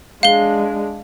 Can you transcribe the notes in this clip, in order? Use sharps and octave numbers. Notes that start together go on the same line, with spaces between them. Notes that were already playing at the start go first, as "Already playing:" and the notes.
G#3 D4 F5 G7